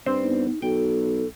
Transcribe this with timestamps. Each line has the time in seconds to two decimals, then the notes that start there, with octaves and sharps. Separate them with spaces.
0.06 G2 C4 C5
0.22 B3 D#4
0.62 B1 F#4 A4 G5